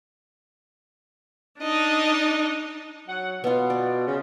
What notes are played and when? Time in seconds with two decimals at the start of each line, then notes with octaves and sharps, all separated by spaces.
1.61 D4 D#4 D#5
3.08 F#3 F#5
3.44 B2 B3 F4
3.70 D5
4.07 C#3